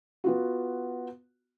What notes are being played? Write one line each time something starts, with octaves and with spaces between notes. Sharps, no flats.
B3 F4 F#4